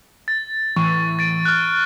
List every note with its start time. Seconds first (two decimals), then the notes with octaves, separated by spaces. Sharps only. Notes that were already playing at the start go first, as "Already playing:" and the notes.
0.28 A6
0.76 A2 E3 C#6
1.19 A6 D7
1.45 F6 F#6